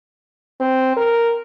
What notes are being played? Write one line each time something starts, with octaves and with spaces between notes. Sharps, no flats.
C4
A#4